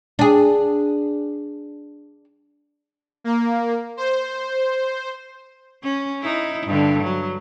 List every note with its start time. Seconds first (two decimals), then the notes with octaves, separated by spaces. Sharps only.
0.19 D4 G#4
3.24 A#3
3.97 C5
5.84 C#4
6.22 D#4 E4
6.66 G2 D3
7.03 F#3